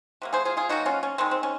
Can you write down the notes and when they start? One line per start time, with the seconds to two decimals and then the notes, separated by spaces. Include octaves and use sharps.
0.22 C3 F#3 A#3
0.33 G#4 C5
0.45 F4 G#4
0.57 F4 G#4
0.69 D#3 F#3 A#3 D#4 F#4
0.85 C#4 F4
1.03 C#4
1.18 D#3 G#3 C4
1.31 C4
1.43 C#4